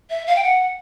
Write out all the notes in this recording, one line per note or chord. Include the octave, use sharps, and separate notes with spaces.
E5
F5
G5
F#5